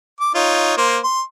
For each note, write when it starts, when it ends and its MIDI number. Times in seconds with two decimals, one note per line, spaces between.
0.20 0.30 86
0.35 0.73 63
0.35 0.73 65
0.35 0.73 73
0.77 0.98 58
0.77 0.98 72
1.04 1.21 84